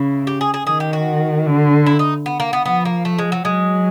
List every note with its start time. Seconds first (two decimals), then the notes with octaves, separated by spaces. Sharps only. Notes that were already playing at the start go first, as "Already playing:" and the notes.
Already playing: C#3 E4
0.27 G4
0.41 G#4
0.54 G#4
0.67 D#3 G#4
0.80 G4
0.93 F#4
1.46 D3
1.86 E4
1.99 D#4
2.26 B3
2.40 A#3
2.53 B3
2.66 F3 B3
2.85 A#3
3.05 A3
3.19 G#3
3.32 F#3
3.45 F#3 G#3